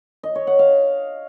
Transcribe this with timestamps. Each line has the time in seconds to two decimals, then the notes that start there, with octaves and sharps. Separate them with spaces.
0.23 D#5
0.35 C#5
0.47 F#5
0.59 F5